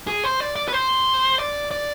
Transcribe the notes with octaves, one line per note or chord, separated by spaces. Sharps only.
G#4
C5
D5
D5
B4
C5
D5
D5